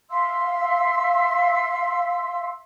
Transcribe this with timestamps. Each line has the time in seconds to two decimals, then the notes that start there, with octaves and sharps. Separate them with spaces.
0.09 E5 F5 C6 E6